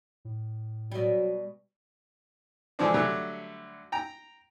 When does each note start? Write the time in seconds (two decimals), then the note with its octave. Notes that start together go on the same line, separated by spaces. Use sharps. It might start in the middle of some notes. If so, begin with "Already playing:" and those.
0.25 A2
0.91 B2 F#3 G3
2.79 D3 E3 F3 G#3 C4 D4
2.94 D3 F#3 G3 A3
3.92 G5 A#5